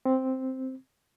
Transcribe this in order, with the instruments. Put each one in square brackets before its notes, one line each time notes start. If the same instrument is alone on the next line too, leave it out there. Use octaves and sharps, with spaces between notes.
[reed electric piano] C4